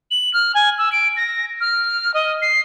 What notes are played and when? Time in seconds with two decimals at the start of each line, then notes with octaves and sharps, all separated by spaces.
0.11 F#7
0.34 F6
0.54 G#5
0.78 E6
0.92 D7
1.16 A#6
1.60 F6
2.14 D#5
2.42 C7